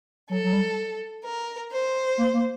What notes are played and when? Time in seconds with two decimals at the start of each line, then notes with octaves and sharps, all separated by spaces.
0.30 F#3 A4
0.44 F#3
0.53 G3
1.24 A#4
1.71 C5
2.18 A#3
2.34 A#3